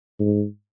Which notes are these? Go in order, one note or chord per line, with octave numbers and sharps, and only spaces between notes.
G#2